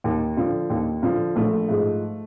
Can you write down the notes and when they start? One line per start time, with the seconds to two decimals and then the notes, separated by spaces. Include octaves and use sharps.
0.04 D#2
0.37 D3 F3
0.70 D#2
1.02 D3 F3
1.36 A#1 A3
1.69 G#2 F3